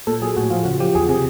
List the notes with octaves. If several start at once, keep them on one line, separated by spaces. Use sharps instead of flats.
A#2 A4
F#3 G#4
A2 F#4
F3 F4
C#3 F#4
F3 G4
E2 G#4
C3